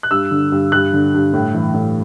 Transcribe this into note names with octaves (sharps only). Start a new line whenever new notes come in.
F#6
G2 E6
D3
G2
G2 F#6
D3
G2
A2
E3
A2